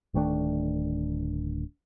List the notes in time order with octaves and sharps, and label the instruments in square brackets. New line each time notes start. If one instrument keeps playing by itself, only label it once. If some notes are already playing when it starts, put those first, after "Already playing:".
[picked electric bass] D1 D#3 A3 D4